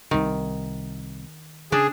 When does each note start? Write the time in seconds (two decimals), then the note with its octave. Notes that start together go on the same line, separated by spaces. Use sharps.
0.11 C2 C3 D#3
1.72 C#3 D4 G#4